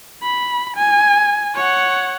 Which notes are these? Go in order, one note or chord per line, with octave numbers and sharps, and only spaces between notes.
B5
G#5
C#5 F#5